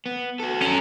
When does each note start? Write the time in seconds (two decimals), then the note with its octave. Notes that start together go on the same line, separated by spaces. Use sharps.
0.06 B3
0.40 F#4 A4
0.62 F#3 C#4